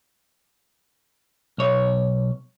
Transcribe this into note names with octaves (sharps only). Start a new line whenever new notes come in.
B1 C#5